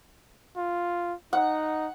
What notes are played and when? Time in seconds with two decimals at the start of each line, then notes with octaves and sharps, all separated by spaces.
0.57 F4
1.33 D#4 F#5